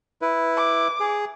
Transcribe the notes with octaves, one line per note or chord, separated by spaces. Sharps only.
E4 B4
D6
G#4